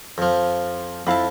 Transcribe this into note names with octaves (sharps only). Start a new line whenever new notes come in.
F2 F3
F2 E4 F5 A5 B5